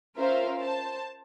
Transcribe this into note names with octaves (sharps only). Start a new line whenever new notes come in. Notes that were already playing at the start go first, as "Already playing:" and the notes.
C#4 F4 A#4 C5 E5 F5
C5 A5